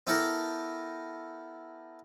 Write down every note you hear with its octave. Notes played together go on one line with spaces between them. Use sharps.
B3 E4 G4 A4 A#4